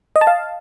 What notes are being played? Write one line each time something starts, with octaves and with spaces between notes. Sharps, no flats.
D#5
A5
F5